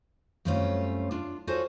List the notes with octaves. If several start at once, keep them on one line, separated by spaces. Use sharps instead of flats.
F#2 G3 A3 C4 C#4 F4
D4 F4
F4 F#4 G#4 A4 C5 C#5